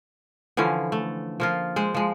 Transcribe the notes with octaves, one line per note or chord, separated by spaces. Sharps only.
D3 E3 F3 C#4
A3
F3 A#3 F4
G#3 C5
F3 G#3